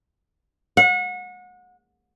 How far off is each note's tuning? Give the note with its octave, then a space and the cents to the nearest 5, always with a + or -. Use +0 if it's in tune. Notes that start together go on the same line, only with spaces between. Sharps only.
F#5 -30